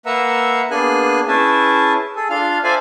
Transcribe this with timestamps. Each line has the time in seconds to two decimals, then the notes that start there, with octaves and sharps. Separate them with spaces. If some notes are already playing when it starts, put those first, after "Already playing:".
0.06 A#3 B4 E5 F#5 A#5 E6
0.71 A#3 B3 D4 G#4 G#5 F#6
1.28 C#4 E4 G#4 B4 E5 A5
2.16 G#4 A4
2.30 D4 F4 F5 F6
2.64 A4 C5 D5 E5 F5 G#5